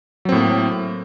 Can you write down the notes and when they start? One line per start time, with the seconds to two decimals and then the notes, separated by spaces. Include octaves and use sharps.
0.25 F#3
0.29 C4
0.32 A2
0.36 A#3